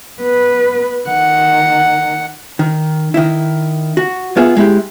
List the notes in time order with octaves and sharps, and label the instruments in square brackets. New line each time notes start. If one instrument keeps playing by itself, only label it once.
[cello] B3 B4
[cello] D#3 [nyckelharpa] F#5
[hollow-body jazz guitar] D#3
D#3 E4
F#4
B3 F4 G#4 E5
G#3 E4 G4